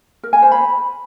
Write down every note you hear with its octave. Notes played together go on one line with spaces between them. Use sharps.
A#4
G#5
C5
B5